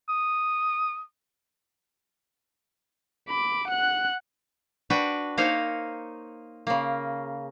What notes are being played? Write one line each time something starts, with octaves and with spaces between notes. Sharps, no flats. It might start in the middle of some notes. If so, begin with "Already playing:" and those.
D#6
B5 D6
F#5 F#6
D4 F#4 B4 G5
A#3 D#4 C5 C#5 F5
C#3 A#3